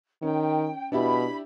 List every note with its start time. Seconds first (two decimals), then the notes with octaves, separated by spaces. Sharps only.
0.23 D#3 C#4 G5
0.92 B2 D4 E4 G4 B5